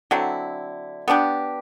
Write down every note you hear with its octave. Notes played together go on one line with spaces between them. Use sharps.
D3 F#3 C4 E4
B3 D4 G4